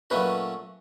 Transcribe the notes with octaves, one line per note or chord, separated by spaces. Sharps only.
A#2 F#3 A3 C#4 F#4 B4